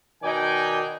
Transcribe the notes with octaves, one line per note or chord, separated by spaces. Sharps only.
B2 D#3 D#4 D5 G5 G#5